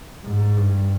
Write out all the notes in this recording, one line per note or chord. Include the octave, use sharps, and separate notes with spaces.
G#2
G2